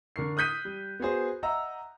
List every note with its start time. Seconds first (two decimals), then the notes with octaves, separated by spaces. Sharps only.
0.16 D3 A#4 C#6 C7
0.37 D#6 F#6 G6 B6 D#7
0.65 G3
1.00 B3 F#4 G#4 C5
1.43 D#5 E5 F#5 A#5 E6